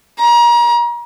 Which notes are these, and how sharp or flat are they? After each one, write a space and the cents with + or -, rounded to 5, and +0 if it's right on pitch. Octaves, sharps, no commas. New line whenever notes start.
A#5 +35